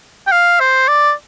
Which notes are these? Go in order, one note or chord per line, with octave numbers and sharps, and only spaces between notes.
G5
F5
C5
D5